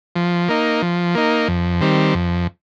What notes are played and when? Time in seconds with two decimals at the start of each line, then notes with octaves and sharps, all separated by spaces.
0.16 F3
0.49 A#3 D#4
0.82 F3
1.15 A#3 D#4
1.48 F2
1.81 D#3 G3 C4
2.14 F2